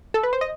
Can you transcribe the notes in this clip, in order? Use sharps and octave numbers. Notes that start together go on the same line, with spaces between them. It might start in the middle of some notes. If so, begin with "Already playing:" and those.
A4
B4
C5
D#5